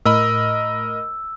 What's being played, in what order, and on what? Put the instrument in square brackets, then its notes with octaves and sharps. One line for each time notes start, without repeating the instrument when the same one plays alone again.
[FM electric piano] A2 [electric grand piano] A#4 D#5 B5 [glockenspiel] E6